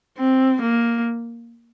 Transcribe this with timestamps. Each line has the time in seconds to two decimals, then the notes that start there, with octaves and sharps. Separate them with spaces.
0.18 C4
0.62 A#3